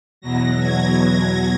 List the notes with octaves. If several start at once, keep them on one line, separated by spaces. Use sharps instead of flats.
E2 B2 F#3 A#6
G#6